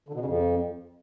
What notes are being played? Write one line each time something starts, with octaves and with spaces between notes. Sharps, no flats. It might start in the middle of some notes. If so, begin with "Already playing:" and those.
D3
B2
C#3
F2